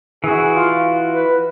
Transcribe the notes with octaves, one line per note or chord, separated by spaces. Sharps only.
E3 F#4 G#4
F4
B4